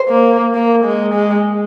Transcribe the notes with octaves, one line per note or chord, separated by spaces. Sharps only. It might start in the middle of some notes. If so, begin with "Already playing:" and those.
Already playing: C5
A#3
A#3
G#3
G#3